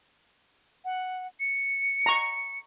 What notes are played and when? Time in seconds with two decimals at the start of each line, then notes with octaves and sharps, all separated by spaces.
0.85 F#5
1.40 C#7
2.06 A#5 C#6